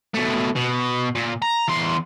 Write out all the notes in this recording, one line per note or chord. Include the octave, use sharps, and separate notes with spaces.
B2 A3
B2
A#2
A#5
E2 C6